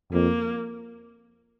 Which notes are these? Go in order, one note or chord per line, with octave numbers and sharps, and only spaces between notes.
F2 A#3